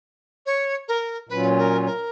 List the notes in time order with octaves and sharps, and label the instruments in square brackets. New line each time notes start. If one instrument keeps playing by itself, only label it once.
[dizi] C#5
A#4
[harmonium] A#2 F#3 C#4 F4 [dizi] B4
[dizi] A#4
A#4